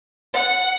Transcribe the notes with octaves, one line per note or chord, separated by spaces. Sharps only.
F#5